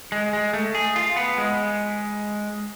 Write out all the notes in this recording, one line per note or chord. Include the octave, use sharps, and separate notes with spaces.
G#3
G#3
A3
G#4
F4
B3
G#3